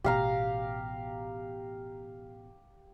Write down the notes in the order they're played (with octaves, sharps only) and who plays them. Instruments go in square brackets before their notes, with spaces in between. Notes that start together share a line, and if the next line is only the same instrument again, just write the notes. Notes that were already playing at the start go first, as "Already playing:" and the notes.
[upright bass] A1 B2 [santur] G4 F5 A#5